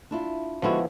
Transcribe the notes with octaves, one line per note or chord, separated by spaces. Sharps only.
D4 E4 F4
D3 F3 G#3 B3 E4 F#4